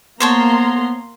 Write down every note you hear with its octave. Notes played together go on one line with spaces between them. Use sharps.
A#3 B3 C5 C#5 A5 A#5 C6